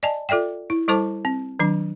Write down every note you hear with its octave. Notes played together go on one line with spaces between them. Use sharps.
D5 D#5 G#5 A5
F4 A4 D5 E5 G5
E4
G3 E4 A4 C5 A5 D6
C4
D#3 F#3 D4